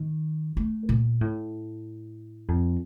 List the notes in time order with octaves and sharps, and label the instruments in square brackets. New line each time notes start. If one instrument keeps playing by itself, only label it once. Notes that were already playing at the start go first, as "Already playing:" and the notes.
Already playing: [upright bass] D#3
A3
A#2
A2
F2